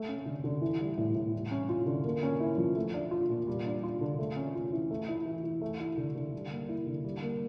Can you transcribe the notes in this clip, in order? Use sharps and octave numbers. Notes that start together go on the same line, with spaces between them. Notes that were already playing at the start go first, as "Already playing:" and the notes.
Already playing: A3
C#4
D3
D3
E3
G3
A2
A2
G3
C#4
F4
D3
A#3
C#4
E4
F3
A3
D4
F4
A#2
G3
D4
F4
D3
A3
C#4
F4
E3
A3
E4
E3
E3
A3
E4
D3
D3
G3
A#3
E4
D3
G3
A#3